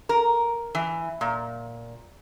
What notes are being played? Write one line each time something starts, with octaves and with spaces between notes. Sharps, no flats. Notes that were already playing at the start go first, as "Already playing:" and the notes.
A#4
E3
A#2